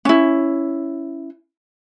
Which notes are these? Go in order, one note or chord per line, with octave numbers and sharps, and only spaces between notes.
C#4 E4